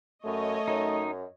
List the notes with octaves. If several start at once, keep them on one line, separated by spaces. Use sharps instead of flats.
F#2 A3 C#5 D#5
F#2 D#4